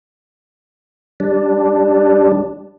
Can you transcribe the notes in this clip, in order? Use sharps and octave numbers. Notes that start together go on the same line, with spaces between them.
G3 D4